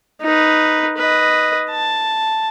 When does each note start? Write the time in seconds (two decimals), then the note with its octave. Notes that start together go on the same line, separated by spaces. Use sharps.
0.22 D#4 B4
0.97 B4 D#5
1.71 A5